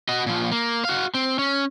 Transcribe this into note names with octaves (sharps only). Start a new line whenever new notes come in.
F#4 D#5
A#2 F3
A#3
F#4 F5
C4
C#4